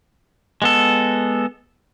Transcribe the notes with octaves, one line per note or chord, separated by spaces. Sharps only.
G#3 B3 A4